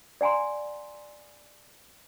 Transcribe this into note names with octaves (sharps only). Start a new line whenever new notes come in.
D5 F#5 G#5 A#5 C6